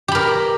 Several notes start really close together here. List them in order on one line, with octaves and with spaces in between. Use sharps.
G4 B5 A#4